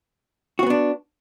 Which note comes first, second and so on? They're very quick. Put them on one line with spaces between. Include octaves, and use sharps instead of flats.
F#4 C4 B3 D4